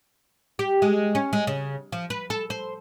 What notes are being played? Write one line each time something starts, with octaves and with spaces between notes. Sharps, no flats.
G4
G#3
C#4
G#3
C#3
F3
B4
A4
C5